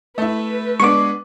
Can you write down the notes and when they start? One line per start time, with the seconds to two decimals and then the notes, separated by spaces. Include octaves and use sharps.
0.18 A3 E4 B4
0.80 G#3 B3 D4 C#6 D6